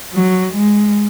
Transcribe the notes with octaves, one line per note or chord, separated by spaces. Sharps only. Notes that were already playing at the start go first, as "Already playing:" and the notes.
F#3
G#3